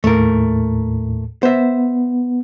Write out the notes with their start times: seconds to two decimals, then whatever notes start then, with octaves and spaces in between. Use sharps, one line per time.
0.04 D#2 A2 A3 A#4
1.43 B3 C5 E5